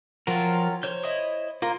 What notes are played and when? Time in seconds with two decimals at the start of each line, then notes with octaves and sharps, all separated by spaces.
0.27 F3 F#3 C4 F4 A#4
0.83 C5 C#5 G6
1.03 E4 D#5
1.62 A#3 F4